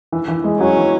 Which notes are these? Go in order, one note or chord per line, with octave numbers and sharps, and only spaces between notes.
E3
E3
G#3
F#3 C#4
E3